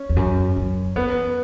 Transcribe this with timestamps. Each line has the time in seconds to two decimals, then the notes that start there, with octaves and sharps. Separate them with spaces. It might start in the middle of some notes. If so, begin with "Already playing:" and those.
Already playing: C#4
0.09 E2
0.16 F#2
0.56 F#2
0.96 E2 B3